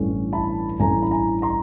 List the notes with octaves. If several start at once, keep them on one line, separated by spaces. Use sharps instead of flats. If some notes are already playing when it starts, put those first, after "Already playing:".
Already playing: A1 G2 E3 A3 C#4
A5 B5
A1 G2 E3 A3 C#4 G#5 A#5
B5
G#5 A#5
A#5 C6